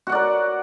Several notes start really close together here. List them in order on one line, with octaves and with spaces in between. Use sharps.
F#4 F#5 D5 A#4